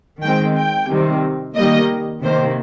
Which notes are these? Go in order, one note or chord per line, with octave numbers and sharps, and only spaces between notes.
D#3 G#3 C4 G5
G5
C3 D#3 G3 C4
D#3 G3 A#3 D#5
C3 D#3 A#3 C5